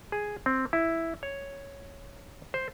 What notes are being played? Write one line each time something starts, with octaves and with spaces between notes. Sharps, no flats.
G#4
C4
E4
C#5
C5